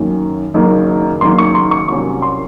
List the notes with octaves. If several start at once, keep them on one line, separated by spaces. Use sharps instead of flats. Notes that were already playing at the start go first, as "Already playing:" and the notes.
Already playing: F#2 D#3 A#3 C#4
F#1 F#2 D#3 A#3
F#1 F#2 D#3 A#3 C6
C#6
C6
C#6
C2 C3 F#3 A#3 C#4 C#6
C6